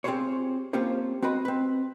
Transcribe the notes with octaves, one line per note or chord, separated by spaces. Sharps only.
C4 F4 G4 G#4 C5 C#5
A#3 C4 C#4 F4 G4 C5
C4 F#4 B4 D#5 B5
C4 B4